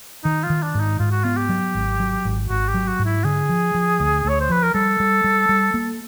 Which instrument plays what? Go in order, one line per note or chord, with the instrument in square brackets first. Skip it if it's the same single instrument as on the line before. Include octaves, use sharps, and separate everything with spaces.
[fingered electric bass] D#3 [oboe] D#4
[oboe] F4
[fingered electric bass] D#3
[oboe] D4
[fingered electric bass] G#2
[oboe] D#4
[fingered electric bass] G#2 [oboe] F4
[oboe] F#4
[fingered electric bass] B3 [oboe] F4
[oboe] G4
[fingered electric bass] F#3
G#1
F#3
G#1
[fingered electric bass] G#1 [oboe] F#4
[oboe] G4
[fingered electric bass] F#3
[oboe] F#4
[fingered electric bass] G#2
[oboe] E4
[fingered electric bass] D3 [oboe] G#4
[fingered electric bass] F3
F3
D2
[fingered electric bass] D2 [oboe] C#5
[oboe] C5
[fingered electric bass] F3 [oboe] B4
[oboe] A#4
[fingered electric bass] G3 [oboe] A4
[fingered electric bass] G3
G3
G3
A#3